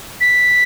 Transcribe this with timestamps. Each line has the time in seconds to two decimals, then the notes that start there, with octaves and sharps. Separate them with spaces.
0.21 B6